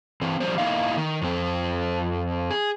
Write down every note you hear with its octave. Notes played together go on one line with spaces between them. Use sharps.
E3 C4
F3 G3 D4 C5
A#3 D#4 E4 D#5 F5
D#3
F2 C4
G#4